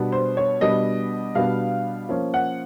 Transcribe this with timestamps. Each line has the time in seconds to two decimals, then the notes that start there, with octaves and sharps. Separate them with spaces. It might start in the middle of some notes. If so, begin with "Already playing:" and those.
Already playing: B2 G3 B3 D4
0.12 C5
0.37 C#5
0.61 B2 G3 B3 D4 D#5
1.35 B2 G3 B3 D4 F5
2.09 F3 A#3 C#4
2.34 F#5